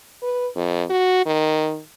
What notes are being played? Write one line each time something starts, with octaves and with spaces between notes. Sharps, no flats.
B4
F2
F#4
D#3